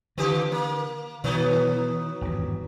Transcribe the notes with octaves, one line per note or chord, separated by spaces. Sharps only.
D3 D#3 F3 G4
A#3
B2 D#3 E3 F#3 B3
G#1 E2 G2